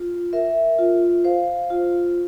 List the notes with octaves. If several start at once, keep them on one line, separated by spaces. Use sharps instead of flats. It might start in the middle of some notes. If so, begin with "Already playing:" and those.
Already playing: F4
A#4 E5
F4
C5 F5
F4